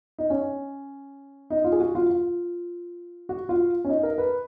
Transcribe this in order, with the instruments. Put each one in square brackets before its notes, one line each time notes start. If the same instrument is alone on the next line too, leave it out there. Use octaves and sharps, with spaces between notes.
[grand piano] D#4
C#4
D#4
F4
G#4
F#4
F4
F4
F#4
F4
C#4
D#4
A#4
B4